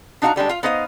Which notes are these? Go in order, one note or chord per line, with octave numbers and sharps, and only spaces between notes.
D4 D#4 F#4 F5 A5 A#5
D3 G3 G#3 D4
F4 F5
B3 D#4 C5 D#5 F5